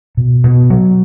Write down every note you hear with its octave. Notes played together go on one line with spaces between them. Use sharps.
B2
B2
F#3